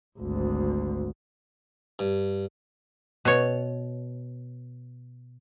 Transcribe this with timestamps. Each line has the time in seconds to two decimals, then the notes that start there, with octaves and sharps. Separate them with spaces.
0.19 G#1 D2
1.99 G2
3.25 B2 C#5